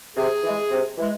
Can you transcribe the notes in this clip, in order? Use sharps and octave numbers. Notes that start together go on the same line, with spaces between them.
C3 G#4
E3 G#3
C3
E3 G#3